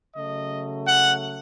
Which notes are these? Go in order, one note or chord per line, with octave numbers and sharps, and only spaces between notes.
C#3 F#3 A3 D#5
F#5